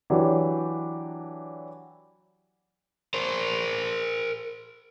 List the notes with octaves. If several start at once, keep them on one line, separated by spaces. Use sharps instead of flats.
E3 F#3 D4 F#4 G4
A#4 C5